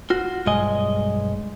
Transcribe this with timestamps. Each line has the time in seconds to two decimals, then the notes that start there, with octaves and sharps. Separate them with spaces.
0.10 F4 F#4
0.46 B1 G2 G#3 D#5 G#5